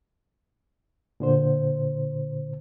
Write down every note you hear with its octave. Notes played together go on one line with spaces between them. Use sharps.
A#2 D3 C5